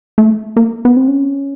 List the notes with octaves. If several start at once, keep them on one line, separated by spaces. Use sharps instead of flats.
A3
A#3
B3
C4
C#4